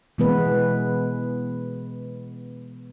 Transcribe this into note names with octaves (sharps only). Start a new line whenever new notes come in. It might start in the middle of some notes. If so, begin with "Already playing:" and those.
B2 E3 G#3 B3 B4